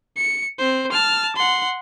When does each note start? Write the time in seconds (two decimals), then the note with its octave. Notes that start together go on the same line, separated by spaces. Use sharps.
0.17 C#7
0.59 C4 C5
0.92 A5 F6
1.36 F#5 C6